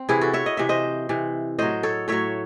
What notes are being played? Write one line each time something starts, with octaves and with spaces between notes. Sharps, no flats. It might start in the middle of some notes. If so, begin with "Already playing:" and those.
Already playing: C4
C3 E3 E4 G#4
F#4 A4
C#5 E5
D#5
C3 E3 E5
C5 D#5
C3 E3
A2 F#3 C5 D#5
A4 C#5
A2 F#3 C#5 E5